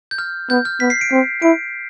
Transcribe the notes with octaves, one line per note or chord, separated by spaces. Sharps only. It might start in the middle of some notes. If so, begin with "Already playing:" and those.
G6
F6
B3 G6
F6
B3 B6
C7
D7
C4
E4 D7